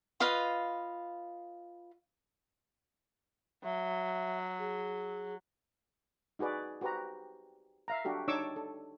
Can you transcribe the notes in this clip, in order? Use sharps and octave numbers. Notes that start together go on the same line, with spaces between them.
F4 B4 D#5 F5
F#3 E5
G#4
D#4 F#4 G#4 B4 D5
F#4 G4 B4 C5 A#5
E5 F5 A#5
D4 F#4 G4 A4
D4 D#4 C#5 C#6 D6 E6
A4